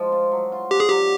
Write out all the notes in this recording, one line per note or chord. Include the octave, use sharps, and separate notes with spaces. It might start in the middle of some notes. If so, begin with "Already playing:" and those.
Already playing: F3 G#3
F4
F#3
F4
D4 G4
G#4
F#3 G4